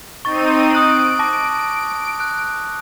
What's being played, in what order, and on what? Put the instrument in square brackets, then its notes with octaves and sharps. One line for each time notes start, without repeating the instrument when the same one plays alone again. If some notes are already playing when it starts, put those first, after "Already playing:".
[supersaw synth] C4 D#4 D#7 [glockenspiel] C#6 A6
[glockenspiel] D#6 F#6 F#7 [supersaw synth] D7
[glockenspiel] A5 D6 A#6
F#6